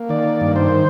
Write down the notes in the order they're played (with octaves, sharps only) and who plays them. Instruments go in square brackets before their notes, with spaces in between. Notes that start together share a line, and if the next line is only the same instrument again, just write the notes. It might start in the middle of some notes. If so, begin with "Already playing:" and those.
Already playing: [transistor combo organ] A#3
D#3 D5
G2
C5